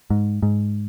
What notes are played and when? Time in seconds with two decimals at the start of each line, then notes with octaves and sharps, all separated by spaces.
0.10 G#2
0.43 G#2